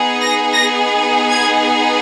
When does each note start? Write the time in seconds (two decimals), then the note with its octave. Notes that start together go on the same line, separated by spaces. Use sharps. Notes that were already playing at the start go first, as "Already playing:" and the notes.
Already playing: B3 D#4 G#4
0.21 A#6
0.53 A#6
1.30 G#6